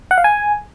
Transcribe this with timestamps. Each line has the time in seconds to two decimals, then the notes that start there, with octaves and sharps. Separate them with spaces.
0.11 F#5
0.18 F5
0.24 G#5